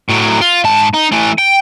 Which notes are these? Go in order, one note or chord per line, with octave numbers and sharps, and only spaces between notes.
A2 F#3
F4
G#2 A5
D#4
E3 A3
G5